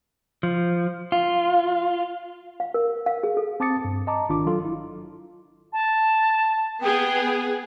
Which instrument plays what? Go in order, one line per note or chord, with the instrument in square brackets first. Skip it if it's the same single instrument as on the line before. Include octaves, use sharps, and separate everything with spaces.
[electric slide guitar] F3
F4
[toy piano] F5
A#4
F5
G#4
A4
[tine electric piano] C4 A5 D6 D#6 A6 C#7
G2
D#5 A5 A#5 D6
G#1 D#3 D4 F4 D6
F#3 F4 A4
E4
[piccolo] A5
[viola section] B3 G#4 [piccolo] G5